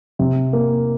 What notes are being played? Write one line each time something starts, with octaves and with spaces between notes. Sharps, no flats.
C3
A#3